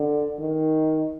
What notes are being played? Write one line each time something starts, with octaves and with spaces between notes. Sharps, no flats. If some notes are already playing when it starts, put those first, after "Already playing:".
Already playing: D3
D#3